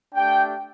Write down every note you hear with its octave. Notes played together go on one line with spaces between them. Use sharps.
A3 D4 G4 G5